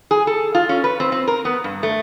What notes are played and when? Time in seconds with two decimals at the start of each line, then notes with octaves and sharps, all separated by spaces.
0.11 G#4
0.27 A4
0.55 F4
0.69 C#4
0.84 B4
1.00 C4
1.12 C4
1.27 A#4
1.45 B3
1.64 G2
1.83 A3